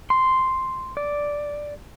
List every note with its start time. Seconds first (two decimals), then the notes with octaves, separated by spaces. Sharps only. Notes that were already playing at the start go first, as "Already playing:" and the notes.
0.10 C6
0.97 D5